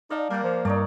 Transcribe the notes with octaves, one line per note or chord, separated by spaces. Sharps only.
D#4 D5 F5 A5
G3 A#3 A#4 F#5
F3
G2 D#4 A#4 C#5 D5